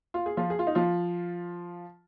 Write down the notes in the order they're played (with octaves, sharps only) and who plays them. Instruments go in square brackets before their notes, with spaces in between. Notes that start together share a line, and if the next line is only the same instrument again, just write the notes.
[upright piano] F4
G#4
F3 F4
G#4
F4
D#4
F3 F4